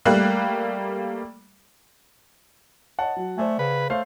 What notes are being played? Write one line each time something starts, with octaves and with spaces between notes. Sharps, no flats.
G3 A3 A#3 F#6
C#5 D#5 F#5 A5
F#3
A3 C5 D5 G#5
C#3 B4
A3 C5 C#5 F5